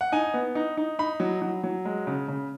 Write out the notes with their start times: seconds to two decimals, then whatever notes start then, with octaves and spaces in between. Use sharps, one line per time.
0.01 F#5
0.12 D#4 G#5
0.34 B3
0.55 D#4
0.77 D#4
0.99 D#4 B5
1.20 F#3
1.42 F#3
1.64 F#3
1.85 G#3
2.07 C#3
2.28 C#3